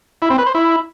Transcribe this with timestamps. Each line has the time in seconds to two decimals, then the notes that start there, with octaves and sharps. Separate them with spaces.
0.22 E4
0.30 C4
0.38 B4
0.46 C5
0.55 E4